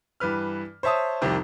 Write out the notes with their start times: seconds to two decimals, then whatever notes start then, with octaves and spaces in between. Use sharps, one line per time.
0.20 G2 E3 B4 F6
0.83 C5 C#5 E5 A5 D#6
1.22 C2 F2 C3 D#3